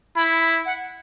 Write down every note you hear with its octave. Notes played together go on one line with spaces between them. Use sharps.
E4 B5
B5
F#5